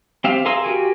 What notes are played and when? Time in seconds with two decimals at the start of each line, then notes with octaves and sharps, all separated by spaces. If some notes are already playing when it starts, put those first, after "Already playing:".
0.24 C4 G4 E5 F5
0.45 G#4 A#4 F5 C6 E6
0.64 F#4 G4 A#4 G#5